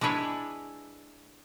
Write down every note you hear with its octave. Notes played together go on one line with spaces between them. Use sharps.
G#3 D4 E4 B4 C#5